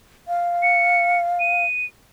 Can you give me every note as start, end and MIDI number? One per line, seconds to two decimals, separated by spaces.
0.28 1.65 77
0.62 1.18 97
1.40 1.85 99